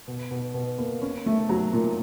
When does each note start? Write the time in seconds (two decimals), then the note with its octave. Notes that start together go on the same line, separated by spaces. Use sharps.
0.08 B2
0.31 B2
0.54 B2
0.78 A#3
1.02 C#4
1.26 A3
1.49 F#3
1.73 A#2